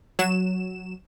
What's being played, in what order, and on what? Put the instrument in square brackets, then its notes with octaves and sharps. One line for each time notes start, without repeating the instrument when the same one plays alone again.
[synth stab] F#3 E7